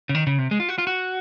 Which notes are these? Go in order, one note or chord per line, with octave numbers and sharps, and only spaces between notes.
C#3
D#3
C#3
C3
G#3
F4
F#4
F4
F#4